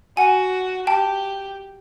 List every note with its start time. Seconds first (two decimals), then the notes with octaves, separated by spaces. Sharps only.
0.17 F#4 F#5 G#5
0.87 G4 G5 A5